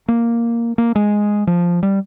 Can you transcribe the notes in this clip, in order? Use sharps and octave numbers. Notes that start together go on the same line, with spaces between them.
A#3
A#3
G#3
F3
G3